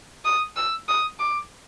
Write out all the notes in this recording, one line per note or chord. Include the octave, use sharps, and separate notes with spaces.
D#6
E6
D#6
D6